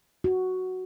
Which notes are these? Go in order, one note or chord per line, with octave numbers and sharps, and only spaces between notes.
F#4